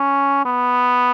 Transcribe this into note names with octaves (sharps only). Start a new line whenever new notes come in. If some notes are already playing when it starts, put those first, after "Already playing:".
Already playing: C#4
B3